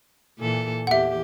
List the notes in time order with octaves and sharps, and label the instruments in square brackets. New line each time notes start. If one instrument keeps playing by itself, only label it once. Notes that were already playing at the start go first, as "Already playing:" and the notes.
[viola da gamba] A#2 E3 A4
[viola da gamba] E2 G4 [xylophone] E5 F#5